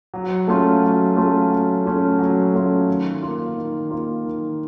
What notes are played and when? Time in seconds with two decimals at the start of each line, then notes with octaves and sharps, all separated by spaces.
0.14 F#3
0.48 A3 C#4 F4
0.82 F#3
1.16 A3 C#4 F4
1.50 F#3
1.85 A3 C#4 F4
2.19 F#3
2.54 A3 C#4 F4
2.88 D#3
3.23 A#3 F4
3.57 D#3
3.91 A#3 F4
4.25 D#3